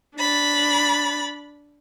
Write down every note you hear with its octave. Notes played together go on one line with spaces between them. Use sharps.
D4 B5 A6